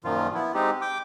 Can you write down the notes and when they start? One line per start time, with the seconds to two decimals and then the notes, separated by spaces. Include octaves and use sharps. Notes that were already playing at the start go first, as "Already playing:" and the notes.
0.04 F#2 A#2 D#3 F3 F4
0.35 B3 E4
0.54 G#3 C4 D#4 G4
0.81 G5 D6